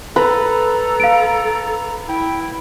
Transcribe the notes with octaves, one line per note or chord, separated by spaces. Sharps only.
A4 B4 A#5
F5 D7
E4 G5